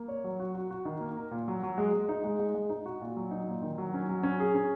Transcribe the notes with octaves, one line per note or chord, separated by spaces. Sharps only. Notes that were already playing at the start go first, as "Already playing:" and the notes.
Already playing: A#3
C#5
F#3
F#4
F#4
F#4
D#3
A#3
A#4
A#2
F#3
F#3
G#3
G#3
D#4
G#3
G#3
G#3
D#4
F#4
A#2
F#3
D#4
A#2
D#3
F#3
C#4
F#3
C#4
G#4
C#4